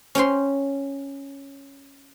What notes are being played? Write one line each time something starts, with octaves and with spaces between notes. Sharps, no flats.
C#4 C#5 G5 C6